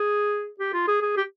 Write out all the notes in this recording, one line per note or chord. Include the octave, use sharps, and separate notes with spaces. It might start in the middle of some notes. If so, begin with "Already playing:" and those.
Already playing: G#4
G4
F4
G#4
G#4
G4